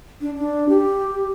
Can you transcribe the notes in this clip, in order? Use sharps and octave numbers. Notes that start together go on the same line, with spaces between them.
D4
D4
G4